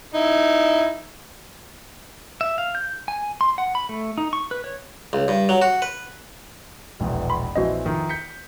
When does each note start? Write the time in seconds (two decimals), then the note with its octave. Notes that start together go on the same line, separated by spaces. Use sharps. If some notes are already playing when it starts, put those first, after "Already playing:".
0.14 D#4 E4
2.41 E5
2.58 F5
2.75 G6
3.08 G#5
3.41 C6
3.58 F#5
3.75 B5
3.89 A3
4.18 D#4
4.33 C#6
4.51 B4
4.64 C#5
5.13 C#2
5.28 G2
5.49 F#3
5.62 F#4
5.82 B4
7.00 E1 A#1 E2
7.30 B5 C6
7.56 A#1 E3 C4 F#4 D#5
7.85 F2 D#3 E3
8.09 G6 B6 C#7